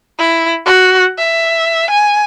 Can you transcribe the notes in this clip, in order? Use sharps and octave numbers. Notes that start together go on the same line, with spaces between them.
E4
F#4
E5
G#5